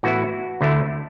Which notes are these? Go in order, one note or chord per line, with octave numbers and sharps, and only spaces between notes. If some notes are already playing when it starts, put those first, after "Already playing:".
A2 E3 B3 E4 F#4
D2 D3 A3 E4